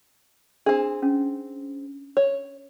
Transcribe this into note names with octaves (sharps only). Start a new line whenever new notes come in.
C4 D4 G#4
C#4
C#5